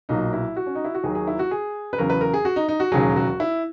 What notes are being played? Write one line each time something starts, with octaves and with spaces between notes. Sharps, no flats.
B1 A#2 F#3 D#4
E4
F#4
C#4
D#4
E4
F#4
D#2 D#3 F#3 G#4
G#4
E4
F#4
G#4
B4
E2 C#3 F#3 A#4
B4
A#4
G#4
F#4
D#4
D#4
F#4
E1 D#2 C#3 F#3 G#4
F#4
E4